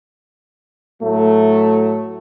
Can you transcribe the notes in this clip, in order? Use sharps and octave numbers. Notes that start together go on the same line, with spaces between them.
A2 F#3 A3